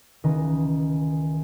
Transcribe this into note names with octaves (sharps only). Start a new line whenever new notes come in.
C#2 D#3 E3 D#5